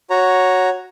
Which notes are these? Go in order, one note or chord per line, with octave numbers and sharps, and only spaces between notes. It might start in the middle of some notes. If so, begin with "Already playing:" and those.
F#4 C#5 A#5